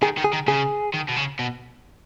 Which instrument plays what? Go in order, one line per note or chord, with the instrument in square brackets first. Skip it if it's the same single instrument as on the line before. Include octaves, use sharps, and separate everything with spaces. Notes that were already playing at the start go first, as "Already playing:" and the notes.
[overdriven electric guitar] D#3 [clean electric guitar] G#4
[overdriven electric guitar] D#3
[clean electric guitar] G#4
[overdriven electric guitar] D#3
[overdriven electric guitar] C#3 [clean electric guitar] G#4
[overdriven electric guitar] D#3
B2
C#3
B2